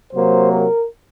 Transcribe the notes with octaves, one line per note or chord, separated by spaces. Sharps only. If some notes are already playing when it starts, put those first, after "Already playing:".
C3 F#3 A#3 C5
A#4